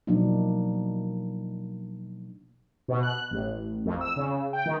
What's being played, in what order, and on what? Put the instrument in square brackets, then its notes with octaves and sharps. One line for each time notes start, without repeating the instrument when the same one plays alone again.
[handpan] B2 F3 F#3 A#3 D4 D#4
[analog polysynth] B2
F#6
A1
F2
E6
C#3
G5
D#3